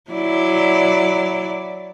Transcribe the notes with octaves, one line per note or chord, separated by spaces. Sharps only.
F#3 E4 D5